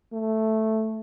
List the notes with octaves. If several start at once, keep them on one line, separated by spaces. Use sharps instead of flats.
A3